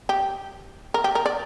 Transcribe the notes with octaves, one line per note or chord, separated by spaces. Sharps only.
G4
A#4
G4
A#4
D5